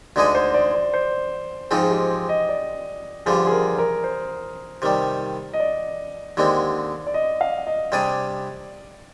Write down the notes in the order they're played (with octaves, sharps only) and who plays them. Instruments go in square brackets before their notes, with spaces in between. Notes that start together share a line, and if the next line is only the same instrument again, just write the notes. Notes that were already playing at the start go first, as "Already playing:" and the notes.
[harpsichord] D2 D3 G#3 D#4 G#4 [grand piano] D5
[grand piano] C5
D5
D5
C5
[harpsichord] G#2 F3 C4 D#4 [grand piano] G#4
[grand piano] G#4
G4
D#5
D5
[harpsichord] G2 D3 F3 [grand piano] G#4
[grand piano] G#4
A#4
A#4
C5
[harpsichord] C3 D#3 G3
[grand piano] D#5
D5
[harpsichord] D#2 D3 G#3 C4
[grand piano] D5
D#5
F5
D#5
[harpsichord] C3 G3 D4 G#4 [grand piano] D5